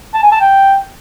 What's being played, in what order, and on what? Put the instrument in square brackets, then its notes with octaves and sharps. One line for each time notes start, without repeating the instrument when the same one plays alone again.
[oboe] A5
G#5
A5
G5